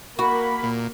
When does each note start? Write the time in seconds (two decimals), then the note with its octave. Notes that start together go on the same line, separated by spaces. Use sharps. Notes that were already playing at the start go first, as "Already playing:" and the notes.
0.19 A#3 F#4 B5
0.63 A#2